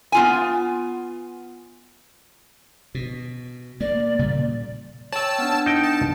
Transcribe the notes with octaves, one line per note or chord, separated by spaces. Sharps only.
B3 F4 G#5
B2
A#3 D5
A#2 C#3 G3
C#5 G5 A5 E6
B3 D4
D#4 G5
A5